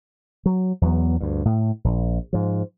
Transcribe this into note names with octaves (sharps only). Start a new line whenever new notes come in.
F#3
E2 F#3 B3
D2 G2
A2
A#1
G#2 F3